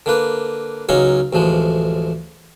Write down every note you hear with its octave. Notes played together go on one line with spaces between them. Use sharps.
D3 A#3 B4
C#2 F#3 C#4 D#4 F5 C#6
A1 D2 F3 G#3